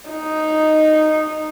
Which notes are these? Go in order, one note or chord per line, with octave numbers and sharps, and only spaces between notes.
D#4